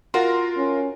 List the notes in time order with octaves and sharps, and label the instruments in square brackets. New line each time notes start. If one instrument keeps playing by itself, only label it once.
[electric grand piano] F4 A#4 C6 [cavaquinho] F#4
[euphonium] C#4